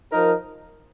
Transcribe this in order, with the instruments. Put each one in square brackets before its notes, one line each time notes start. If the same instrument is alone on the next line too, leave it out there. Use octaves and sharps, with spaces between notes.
[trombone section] F3 D#4 A#4